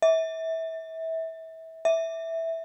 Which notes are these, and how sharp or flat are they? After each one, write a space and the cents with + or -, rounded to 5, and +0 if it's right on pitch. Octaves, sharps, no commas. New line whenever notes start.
E5 -25
E5 -5